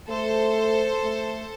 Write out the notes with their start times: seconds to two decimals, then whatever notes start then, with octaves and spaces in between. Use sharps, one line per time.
0.09 A3 A4 C5
1.03 A3